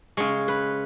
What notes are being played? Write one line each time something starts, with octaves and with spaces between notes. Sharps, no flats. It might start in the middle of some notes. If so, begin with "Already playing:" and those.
C#3 G#3 C#5
B4